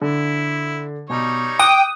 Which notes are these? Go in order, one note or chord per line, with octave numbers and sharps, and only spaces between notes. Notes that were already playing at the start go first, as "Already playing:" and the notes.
D3 E4
B2 G3 D#4 C#5
G5 D6 D#6 F#6 D#7